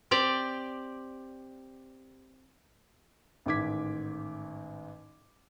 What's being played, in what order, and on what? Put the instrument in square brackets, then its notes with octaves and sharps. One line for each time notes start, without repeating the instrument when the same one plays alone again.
[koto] C4 G4 D5
[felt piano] A1 G#2 D#3 D6 G#6 B6